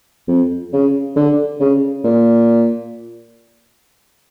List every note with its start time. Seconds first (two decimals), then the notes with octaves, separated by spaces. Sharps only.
0.28 F2
0.73 C#3
1.16 D3
1.60 C#3
2.04 A#2